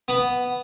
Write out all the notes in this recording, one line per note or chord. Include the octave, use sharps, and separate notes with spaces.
B3